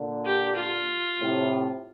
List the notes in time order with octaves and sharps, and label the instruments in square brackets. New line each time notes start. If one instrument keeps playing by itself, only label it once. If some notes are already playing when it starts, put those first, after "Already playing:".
Already playing: [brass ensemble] A#2 D3
[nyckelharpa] G4
F4
[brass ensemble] A2 C3